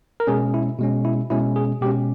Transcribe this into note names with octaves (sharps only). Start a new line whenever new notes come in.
A#4
B2 G#3 C#4 G#4
E4
B2 G#3 C#4
E4
B2 G#3 C#4 E4
G#4
B2 G#3 C#4 G4